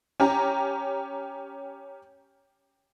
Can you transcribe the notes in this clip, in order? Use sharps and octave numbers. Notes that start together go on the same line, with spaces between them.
C#4 G4 A#5